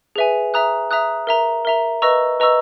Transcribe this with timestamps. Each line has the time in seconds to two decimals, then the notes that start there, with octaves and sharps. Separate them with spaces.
0.16 G#4 B4 E5 G#5
0.54 E5 A#5 D#6 F#6
0.91 E5 A#5 D#6 F#6
1.27 A#4 E5 A#5
1.65 A#4 E5 A#5
2.02 B4 D#5 A#5 C#6 E6
2.40 B4 D#5 A#5 C#6 E6